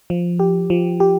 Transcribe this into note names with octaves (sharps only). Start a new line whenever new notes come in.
F3
G4
F3
G4